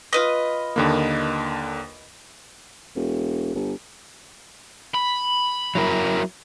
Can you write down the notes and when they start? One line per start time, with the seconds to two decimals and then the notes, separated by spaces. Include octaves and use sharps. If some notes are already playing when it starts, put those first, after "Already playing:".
0.13 F4 B4 D#5
0.76 D#2 D3 A#3
2.96 E1
3.55 G1
4.95 B5
5.75 F#3 E4 A#4